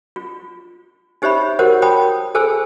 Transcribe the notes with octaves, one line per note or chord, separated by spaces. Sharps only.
F4
D#4 G4 C5 C#5 E5 B5
F#4 G4 A#4 C5 C#5 F#5
C#5 G5 A5 B5 D#6
G#4 A4 C5 G#5 E6